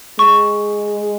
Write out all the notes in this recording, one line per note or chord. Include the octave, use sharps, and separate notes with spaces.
G#3 C#6